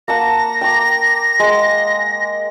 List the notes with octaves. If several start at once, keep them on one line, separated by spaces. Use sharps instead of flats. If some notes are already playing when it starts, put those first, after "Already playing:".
A#3 F#5 A5 A#6
G5 A#5 D6
G#3 F#5